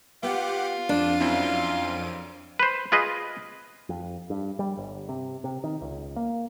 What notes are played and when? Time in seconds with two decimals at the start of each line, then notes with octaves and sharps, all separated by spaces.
0.23 B3 F4 G4 F#5 D6
0.89 F2 D4 D7 D#7
1.20 F#2 C4 E4
2.59 B4 C5
2.92 F4 G#4 B4 D#5
3.89 F2
4.30 G2
4.59 G3
4.77 G1
5.09 C3
5.44 C3
5.64 D#3
5.81 C#2
6.16 A#3